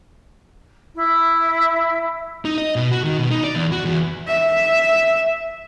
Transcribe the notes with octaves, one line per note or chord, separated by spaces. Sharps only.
E4
D#4
D#5
B2
F#4
D#3
B2
D#4
D5
E2
F#4
E2
E5